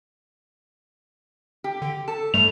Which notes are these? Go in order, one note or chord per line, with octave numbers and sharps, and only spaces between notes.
G4
D3
A4 A5
G2 G3 A3 F7